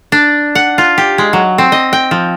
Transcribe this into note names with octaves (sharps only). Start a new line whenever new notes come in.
D4
F#5
F4
G4
G#3
F#3
C4
D#5
G5
F3